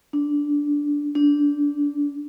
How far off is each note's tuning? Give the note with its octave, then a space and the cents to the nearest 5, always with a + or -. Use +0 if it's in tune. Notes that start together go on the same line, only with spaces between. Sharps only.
D4 -10
D4 -15